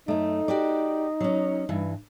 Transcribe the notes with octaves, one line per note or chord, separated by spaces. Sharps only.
F#2 A3 D#4
F#4 G4 D5
F#3 C#4
G2 E3